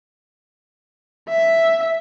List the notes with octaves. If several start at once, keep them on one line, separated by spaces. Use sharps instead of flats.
E5